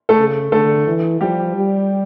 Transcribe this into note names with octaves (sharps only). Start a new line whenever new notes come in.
A3 A4
C#3
D3 A3 A4
E3
F3 G3 G4
G3